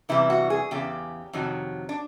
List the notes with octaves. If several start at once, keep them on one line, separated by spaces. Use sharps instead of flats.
E2 C3 E3 G3 E4
F#4
G#4
E2 C#3 G4
F2 C3 D#3 F#3
D4